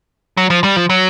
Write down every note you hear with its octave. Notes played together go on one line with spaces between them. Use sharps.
F#3
F3
G3
F3
F#3